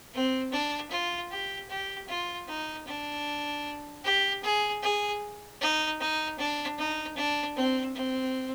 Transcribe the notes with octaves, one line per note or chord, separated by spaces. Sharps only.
C4
D4
F4
G4
G4
F4
D#4
D4
G4
G#4
G#4
D#4
D#4
D4
D#4
D4
C4
C4